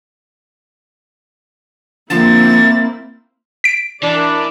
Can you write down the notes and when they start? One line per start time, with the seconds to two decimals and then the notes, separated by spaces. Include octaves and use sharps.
2.10 D3 F3 A#3 C4 E4 A6
3.64 B6 D7
4.03 E3 D4 A#4 D5